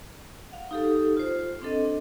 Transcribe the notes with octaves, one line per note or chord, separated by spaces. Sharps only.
F5 F#5
D#4 G4 A4
F4 C5
C4 D4 A4 D#5